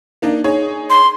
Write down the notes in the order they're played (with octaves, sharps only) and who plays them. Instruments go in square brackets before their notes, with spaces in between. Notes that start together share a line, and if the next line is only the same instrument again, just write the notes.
[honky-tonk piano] A#3 D4 D#4
D#4 G#4 C#5
[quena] C6